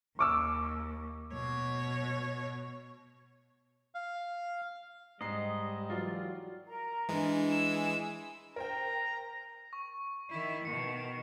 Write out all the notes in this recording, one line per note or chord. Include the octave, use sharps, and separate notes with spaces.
D#2 C#6 D6 E6
B2 C#5
F5
G#2 G3 D#5 C7
E3 F#3 F4 D5
A#4 A#5
E3 G#3 D4 D5
G#5 E6
A#4 C5 G5 A#5
C#6
D#3 E4
B2 D#3 C#7